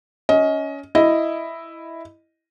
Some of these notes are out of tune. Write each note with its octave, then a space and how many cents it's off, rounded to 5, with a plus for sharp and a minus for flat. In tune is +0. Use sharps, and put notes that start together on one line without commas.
C#4 +20 D#5 +25
E4 +0 D#5 +0